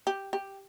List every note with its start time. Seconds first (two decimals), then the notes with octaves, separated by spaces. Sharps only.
0.07 G4
0.33 G4